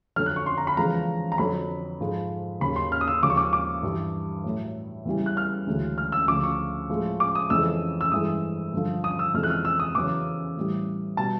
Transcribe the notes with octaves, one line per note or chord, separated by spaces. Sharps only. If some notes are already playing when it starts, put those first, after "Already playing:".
F2 D3 F#3 F6
F#6
C#6
C6
A#5
B5
E2 C#3 F3 G#3 A#5
A#5
F2 D3 F#3 B5
G#2 F3 G#3
D#2 C#3 F#3 B5
C6
F6
D#6
E6
D#2 C#3 F3 G#3 D6
C#6
D6
D6
G2 E3 G3
A2 F#3
E2 C#3 E3 G3
F#6
F6
D2 C#3 E3 G#3
F6
E6
D2 C#3 F3 D6
C#6
A2 F3 G#3
D6
D#6
F2 C#3 E3 G#3 E6
E6
G2 E3 G#3 D#6
G2 D3 F3
D#6
E6
F2 C3 E3 G#3 F6
F#6
F6
E6
D#6
E2 C#3 F#3 D6
A2 E3 G3
B2 G3 A5